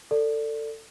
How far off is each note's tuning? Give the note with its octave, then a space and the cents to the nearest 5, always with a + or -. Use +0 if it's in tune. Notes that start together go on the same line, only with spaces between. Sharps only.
A4 +20 D5 +0